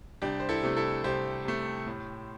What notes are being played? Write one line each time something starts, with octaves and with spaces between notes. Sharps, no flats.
C2 D4 G4
C5
E4 A4
C3 A3
E4 A4
C2 G4 C5
C3 A3
A2